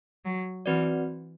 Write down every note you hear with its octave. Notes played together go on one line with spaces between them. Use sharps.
F#3
E3 C4 F#4 B4 D5